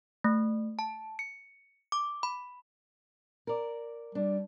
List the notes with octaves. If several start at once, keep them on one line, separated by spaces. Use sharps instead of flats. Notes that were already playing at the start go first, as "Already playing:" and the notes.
A3
A5
C#7
D6
B5
A#4 D5
G3 D4